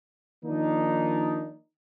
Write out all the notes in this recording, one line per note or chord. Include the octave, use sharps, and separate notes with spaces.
D#3 F3 A#3 D4 D#4